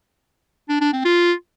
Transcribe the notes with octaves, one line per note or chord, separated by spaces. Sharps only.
D4
D4
C4
F4